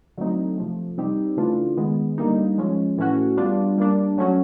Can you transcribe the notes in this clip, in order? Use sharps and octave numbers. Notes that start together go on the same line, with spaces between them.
D3 F#3 A3 C4 D#4
C3 F3 A3
G3 C4 D#4 G4
C#3 E3 A3 D4 F4
D#3 G#3 B3
D3 G3 A#3 D#4
F3 G#3 C#4
A2 E3 A3 C#4 F#4
G3 B3 D4 F4
G3 A#3 D4
F#3 A3 C#4 F#4